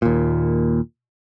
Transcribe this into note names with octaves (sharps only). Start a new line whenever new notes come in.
D#2 A#2